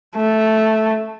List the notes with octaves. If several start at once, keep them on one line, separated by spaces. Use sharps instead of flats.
A3